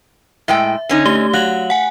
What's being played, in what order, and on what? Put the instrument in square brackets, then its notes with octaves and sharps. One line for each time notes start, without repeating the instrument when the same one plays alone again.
[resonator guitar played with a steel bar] A2 G#3 G5 [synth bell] E5
[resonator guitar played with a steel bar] D3 C#4 D#4
[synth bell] A3 G4 G7
[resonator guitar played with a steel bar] F#3 [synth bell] F5 F#6 F#7
[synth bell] F#5 G#5